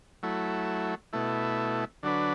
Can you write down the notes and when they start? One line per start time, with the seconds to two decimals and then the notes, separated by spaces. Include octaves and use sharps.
0.23 F#3 A3 E4
1.13 B2 A3 E4
2.03 D3 F#3 D4 B4